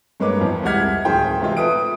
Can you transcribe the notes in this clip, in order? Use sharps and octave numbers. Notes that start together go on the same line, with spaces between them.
G2 G#3 A#3 B4 C#5 D6
F2 E3 B3
C2 G#3 F#5 F6 G#6 B6
D1 D#3 F3 G#4 C5 G5
C3 E3 G#3 E4 F4
A4 B4 D#6 D7